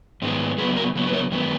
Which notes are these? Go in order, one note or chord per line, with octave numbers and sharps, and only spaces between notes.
G#2 D#3 G#3 B3
C#3 F#3 B3 G#4 B4
F#4 A#4
C#3 F#3 B3
B4
A#4 C#5
F#2 D#3 G#3 B3